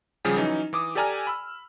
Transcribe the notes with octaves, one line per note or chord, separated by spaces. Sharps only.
C#3 F3 G3 F4 G4 G#4
E3 F#3 C#4 D#4
E3 D6 D#6
G4 A4 D5 G#5 A#5 F6
B5 E6